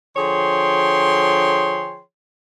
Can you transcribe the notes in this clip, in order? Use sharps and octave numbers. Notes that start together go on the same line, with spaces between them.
D3 F3 G#4 C#5 G5 C6